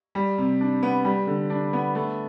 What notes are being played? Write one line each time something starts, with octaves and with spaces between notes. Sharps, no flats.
G3
C3
D4
B3
G3
D3
D4
B3
A3